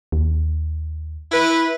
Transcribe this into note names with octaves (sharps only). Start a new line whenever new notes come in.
D#2
E4 B4